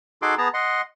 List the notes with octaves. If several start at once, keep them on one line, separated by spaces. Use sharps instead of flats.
D#4 F#4 G#4 A4 C6 D6
B3 G#4 A5 A#5
D#5 F#5 C6